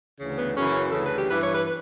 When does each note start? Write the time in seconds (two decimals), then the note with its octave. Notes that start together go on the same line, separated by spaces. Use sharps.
0.18 D2 C#3 E3
0.37 B3
0.55 F#2 C#3 E3 C#4
0.91 D2 C#3 E3 A4
1.05 B4
1.16 G4
1.28 G2 E3 B4
1.41 C#5
1.53 B4
1.66 B4